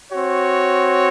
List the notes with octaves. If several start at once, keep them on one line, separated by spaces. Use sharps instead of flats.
C4 F#4 C#5